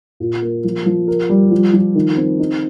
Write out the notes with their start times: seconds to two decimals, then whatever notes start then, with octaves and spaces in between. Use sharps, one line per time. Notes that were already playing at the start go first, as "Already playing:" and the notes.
0.20 A#2
0.42 A#3
0.64 F3
0.86 F3
1.08 A#4
1.29 G3
1.51 F3
1.73 F3
1.95 D#3
2.17 C4
2.39 D#4